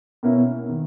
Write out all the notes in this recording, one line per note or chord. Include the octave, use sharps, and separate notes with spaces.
B2 A#3 C#4 E4
D#3